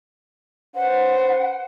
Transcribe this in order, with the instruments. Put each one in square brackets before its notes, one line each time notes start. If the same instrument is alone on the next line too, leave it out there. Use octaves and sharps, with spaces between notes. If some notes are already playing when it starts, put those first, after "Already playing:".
[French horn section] C#4 B4 C5 [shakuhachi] F#5